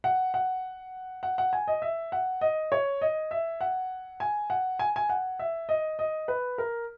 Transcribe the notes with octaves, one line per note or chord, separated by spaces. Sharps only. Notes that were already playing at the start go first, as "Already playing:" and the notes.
F#5
F#5
F#5
F#5
G#5
D#5
E5
F#5
D#5
C#5
D#5
E5
F#5
G#5
F#5
G#5
G#5
F#5
E5
D#5
D#5
B4
A#4